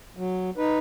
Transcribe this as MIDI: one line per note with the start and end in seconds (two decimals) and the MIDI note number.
0.17 0.50 54
0.58 0.79 63
0.58 0.79 71